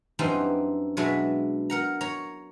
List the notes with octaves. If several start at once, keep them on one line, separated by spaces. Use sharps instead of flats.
F#2 E3 G3 C4 D4 D#4
B2 F#3 G#3 D4 E4 E5
A#4 F#5 A#5
C#5 A#5